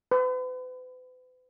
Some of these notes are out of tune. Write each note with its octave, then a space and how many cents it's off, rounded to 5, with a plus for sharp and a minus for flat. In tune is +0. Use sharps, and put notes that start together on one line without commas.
B4 +45